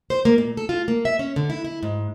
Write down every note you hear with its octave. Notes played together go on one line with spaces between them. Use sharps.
C5
A#3
A#2
A4
F4
A#3
E5
C#4
D3
E4
E4
G#2